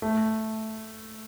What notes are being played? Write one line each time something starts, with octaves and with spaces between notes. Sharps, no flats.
A3